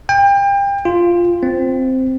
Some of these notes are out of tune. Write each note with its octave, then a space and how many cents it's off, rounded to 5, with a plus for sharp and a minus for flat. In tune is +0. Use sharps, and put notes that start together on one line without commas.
G5 +30
F4 -5
C4 -5